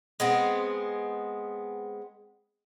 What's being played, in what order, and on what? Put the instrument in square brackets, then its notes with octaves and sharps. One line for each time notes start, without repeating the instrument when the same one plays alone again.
[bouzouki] G#3 B3 C4